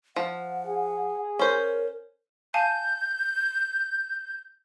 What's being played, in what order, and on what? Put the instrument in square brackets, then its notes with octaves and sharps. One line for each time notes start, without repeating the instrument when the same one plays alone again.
[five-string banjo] F3 [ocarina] F#5
[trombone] G#4
[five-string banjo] C#4 C5 [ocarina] A#4
[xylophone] F5 G#5 A5 [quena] G6